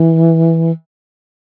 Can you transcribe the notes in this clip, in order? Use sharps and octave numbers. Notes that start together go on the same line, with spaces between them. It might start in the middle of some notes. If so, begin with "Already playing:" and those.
Already playing: E3